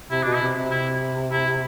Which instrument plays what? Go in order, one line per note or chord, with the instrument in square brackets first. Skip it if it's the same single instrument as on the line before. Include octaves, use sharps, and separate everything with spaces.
[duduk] C3 [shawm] E4
[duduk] B2 [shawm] D4
[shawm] E4
[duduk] C3
C3
[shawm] E4
E4